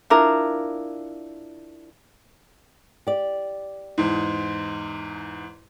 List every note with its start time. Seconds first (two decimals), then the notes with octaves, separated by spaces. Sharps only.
0.10 D4 E4 F4 A#4
3.07 G4 D5
3.98 E2 G#2